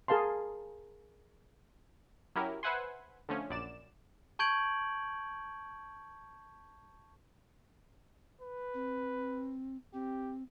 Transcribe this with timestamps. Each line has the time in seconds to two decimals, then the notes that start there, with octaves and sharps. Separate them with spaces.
0.08 G#4 A#4 F5 A5 C6
2.35 F#3 C#4 E4 G4 A#4
2.63 B4 C5 E5 F#5 G#5 C6
3.29 D3 F3 A3 C#4
3.49 A#1 F#2 D5 E7
4.39 A5 C#6 G6 G#6 D7 F#7
8.41 B4
8.74 C4
9.94 C4 G4